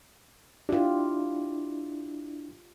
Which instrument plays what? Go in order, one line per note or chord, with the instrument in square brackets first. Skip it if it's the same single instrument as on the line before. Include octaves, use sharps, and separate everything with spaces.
[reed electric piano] D4 E4 [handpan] F4 G4